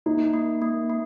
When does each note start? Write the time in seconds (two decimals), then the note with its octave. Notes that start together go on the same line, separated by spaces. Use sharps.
0.06 A#3 D#4
0.34 A#3
0.62 A#3
0.90 A#3